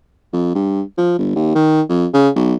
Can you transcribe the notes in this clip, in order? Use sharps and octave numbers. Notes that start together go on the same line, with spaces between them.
F2
G2
F3
G1
D#2
D#3
F2
C#3
B1